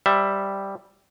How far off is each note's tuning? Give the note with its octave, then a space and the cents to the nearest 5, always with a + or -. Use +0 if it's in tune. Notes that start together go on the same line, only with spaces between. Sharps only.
G3 +0 C5 +0 E5 +0